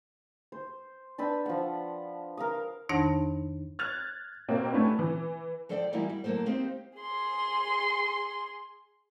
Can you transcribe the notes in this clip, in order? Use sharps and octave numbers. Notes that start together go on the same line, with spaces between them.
C5
D4 B4 G5 E6
F3 F#5
A#4 F5 D#6
F2 D#3 D4 D#4 A5 A#6
F6 F#6 G#6 A6 F7
B2 A#3 C4
A3 C#4 D4 E4 B4
E3
F3 A4 C5 D5 E5 G5
E3 G3 A#3 D#4 E4 F#4
G3
D2 F#3 A3 A#3 A4 C5
A#3 C4 D#4 G4 C5
G#4 C6